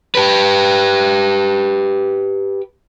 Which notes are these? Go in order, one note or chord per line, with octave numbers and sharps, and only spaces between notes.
G4 B4